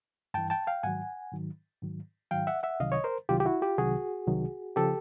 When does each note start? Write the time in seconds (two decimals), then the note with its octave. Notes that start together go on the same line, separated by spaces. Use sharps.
0.34 G2 E3 G5 A5
0.50 G5 A5
0.67 F5 G5
0.83 G#2 D#3 F#3 F#5 G#5
1.32 G#2 D#3 F#3
1.82 G#2 D#3 F#3
2.31 G#2 D#3 F#3 F5 G5
2.47 E5 F#5
2.63 E5 F#5
2.80 C2 C3 D#3 F#3 D#5 F5
2.92 C#5 D#5
3.04 A#4 C5
3.29 C2 C3 D#3 F#3 F4 G4
3.40 G4
3.46 E4 F#4
3.62 F4 G4
3.78 C2 C3 D#3 F#3 F#4 G#4
4.27 C2 C3 D#3 F#3
4.76 C#3 F3 G4 A4